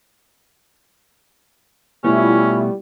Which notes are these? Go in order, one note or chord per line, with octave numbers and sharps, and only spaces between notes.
B2 G3 A3 B3 C#4 E4 F4